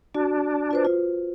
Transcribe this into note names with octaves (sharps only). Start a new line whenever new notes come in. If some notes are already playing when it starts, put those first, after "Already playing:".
D4 F#4
F4 B4 C5
F4